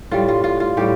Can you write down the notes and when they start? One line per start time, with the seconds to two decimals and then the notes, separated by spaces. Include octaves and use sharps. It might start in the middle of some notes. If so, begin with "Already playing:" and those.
0.11 A2 G3 F4
0.28 F4
0.44 F4
0.60 F4
0.77 A2 G3 G4